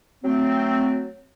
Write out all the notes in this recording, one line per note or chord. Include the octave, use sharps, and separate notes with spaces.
F#3 A3 C4